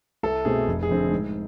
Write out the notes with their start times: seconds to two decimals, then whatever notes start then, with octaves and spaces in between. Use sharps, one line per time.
0.23 C2 A4
0.45 B2 A3 C4 G#4
0.68 F1
0.83 G#4
0.89 F2 D3 A3 C4
1.12 G#2